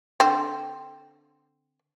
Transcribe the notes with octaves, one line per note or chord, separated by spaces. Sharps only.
D3 C4